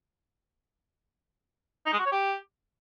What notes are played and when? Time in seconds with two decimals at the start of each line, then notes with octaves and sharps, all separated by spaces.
1.86 D#4
1.93 G#3
1.99 F#4
2.06 C#5
2.12 G4